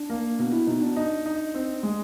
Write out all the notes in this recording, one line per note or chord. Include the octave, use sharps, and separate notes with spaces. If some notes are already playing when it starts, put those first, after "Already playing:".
Already playing: D4
A#3
B2
E4
B2 D#4
D4
D#4
D#4
C4
G#3